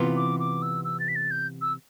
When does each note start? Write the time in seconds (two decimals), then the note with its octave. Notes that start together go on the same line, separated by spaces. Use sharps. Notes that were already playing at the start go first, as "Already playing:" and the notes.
Already playing: C3 E3 B3 F4
0.17 D6
0.40 D6
0.62 E6
0.85 E6
1.00 A6
1.08 B6
1.16 A6
1.31 G6
1.62 E6